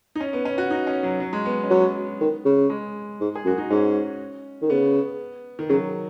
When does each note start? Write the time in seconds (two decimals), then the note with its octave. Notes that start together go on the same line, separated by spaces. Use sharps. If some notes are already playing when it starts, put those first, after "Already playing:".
0.15 D#4
0.21 C#4
0.33 B3
0.45 C#4
0.58 F#4
0.70 D#4
0.87 C#4
1.03 F#3
1.20 F#3
1.33 G#3
1.45 B3
1.64 C#4
1.70 F#3 B3
2.21 D#3
2.45 C#3
2.70 G#3
3.21 G#2
3.35 G#4
3.45 F#2 F#4
3.58 D#4
3.70 G#2 C#4
4.62 D#3
4.70 C#3 B3
5.59 D#3
5.69 C#3 F#3